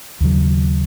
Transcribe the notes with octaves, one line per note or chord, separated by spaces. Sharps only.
D#2 C#3 F#3